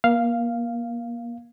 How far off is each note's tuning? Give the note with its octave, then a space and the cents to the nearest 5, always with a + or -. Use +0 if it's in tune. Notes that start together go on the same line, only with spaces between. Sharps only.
A#3 +30 F5 -5